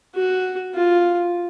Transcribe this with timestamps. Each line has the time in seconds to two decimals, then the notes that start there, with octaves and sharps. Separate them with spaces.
0.15 F#4
0.75 F4